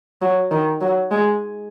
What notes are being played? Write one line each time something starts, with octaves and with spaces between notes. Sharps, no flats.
F#3
D#3
F#3
G#3